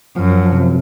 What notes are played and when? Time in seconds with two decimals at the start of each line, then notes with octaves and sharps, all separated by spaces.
0.16 F#2 F3
0.52 C3